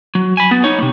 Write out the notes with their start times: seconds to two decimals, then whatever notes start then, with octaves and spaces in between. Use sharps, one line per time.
0.15 F#3
0.37 G#5 B5
0.51 B3
0.64 D#4 C#5
0.79 C3 A#3